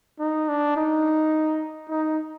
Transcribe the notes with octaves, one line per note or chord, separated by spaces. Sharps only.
D#4
D4
D#4
D#4